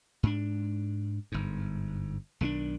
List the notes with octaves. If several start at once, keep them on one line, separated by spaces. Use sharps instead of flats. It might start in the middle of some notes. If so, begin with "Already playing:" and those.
G#2 D4
G1 G#2
B1 D#3 C4 D4